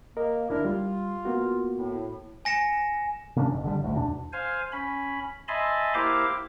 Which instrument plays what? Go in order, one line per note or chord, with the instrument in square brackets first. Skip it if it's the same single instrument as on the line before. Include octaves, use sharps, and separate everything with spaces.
[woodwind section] A#3 [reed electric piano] A#4 D#5
[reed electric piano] D2 D4 [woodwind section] E4 A#4
[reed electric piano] G3 [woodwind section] F4
[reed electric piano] A#3 B3 F#4
[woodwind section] A2
[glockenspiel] G#5 A#6 C#7 E7
[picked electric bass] C3 A#3 C#4 D4
F#1
D3 E3 G3
A1 D2
E2 B2 D4
[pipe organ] C5 F5 G#5
C#4 B5
D#5 E5 G#5 A5 B5 C6
A#3 E4 G4 C5 F5 D6